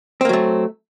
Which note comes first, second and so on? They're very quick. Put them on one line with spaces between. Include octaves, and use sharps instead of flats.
C4 A#3 F#3 A3